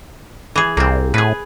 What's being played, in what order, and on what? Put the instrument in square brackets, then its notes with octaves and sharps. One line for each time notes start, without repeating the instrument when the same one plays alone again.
[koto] E3 G#4
[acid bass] C2 [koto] A#3 C4
[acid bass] A2 [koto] G#4 B4